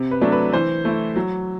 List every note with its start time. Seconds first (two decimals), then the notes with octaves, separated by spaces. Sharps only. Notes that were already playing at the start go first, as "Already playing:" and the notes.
Already playing: C3
0.11 B4
0.21 F#3 A3 D4
0.32 B4
0.52 E3 C5
0.85 A3 E4
1.16 F#3